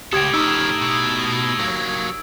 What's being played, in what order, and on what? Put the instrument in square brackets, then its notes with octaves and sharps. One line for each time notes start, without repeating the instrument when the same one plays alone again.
[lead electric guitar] C#2 [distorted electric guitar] A2 A4 [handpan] G4 [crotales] D#6 G#6 D7
[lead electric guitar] C#3 F3 [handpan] D#4 [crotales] E6
[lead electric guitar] B2
F#3 A#3